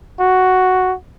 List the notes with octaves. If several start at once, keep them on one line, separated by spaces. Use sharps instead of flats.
F#4